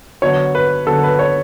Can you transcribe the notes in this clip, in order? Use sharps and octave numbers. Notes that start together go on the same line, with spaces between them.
D3 F#3 B3 C#5
B4
D3 F#3 B3 A4
B4
C#5